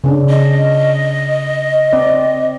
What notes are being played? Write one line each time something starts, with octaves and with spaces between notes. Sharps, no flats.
C#3 C#4 D4
D#5
C4 D5